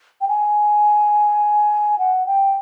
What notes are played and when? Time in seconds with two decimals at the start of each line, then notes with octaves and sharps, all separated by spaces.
0.21 G5
0.28 G#5
1.99 F#5
2.26 G5